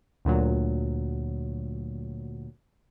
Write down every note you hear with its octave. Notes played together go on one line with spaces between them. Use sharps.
D2 A#2 F#3